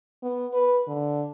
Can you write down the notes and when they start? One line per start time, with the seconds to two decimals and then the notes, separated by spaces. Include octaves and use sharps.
0.23 B3
0.53 B4
0.87 D3